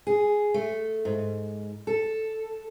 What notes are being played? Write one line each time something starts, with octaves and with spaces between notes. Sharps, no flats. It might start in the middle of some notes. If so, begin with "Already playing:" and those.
G#4
A3
G#2
A4